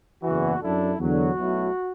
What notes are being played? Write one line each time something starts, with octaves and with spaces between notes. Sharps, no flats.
F#1 E2 E3 F#4
F#2 F#3 D4 E4 A4
E2 D3 F#3 F#4
B1 B2 F#3 A3 E4